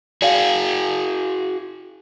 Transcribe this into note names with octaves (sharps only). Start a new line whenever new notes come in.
F#4 G#4 D5 F5